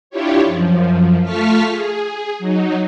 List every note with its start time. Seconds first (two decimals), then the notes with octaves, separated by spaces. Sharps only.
0.10 D4 E4 F4 G4 C#5
0.44 F#2 F3
1.23 A3 F4 A5 C#6 F6 B6
1.69 G#4
2.39 F#3 D#4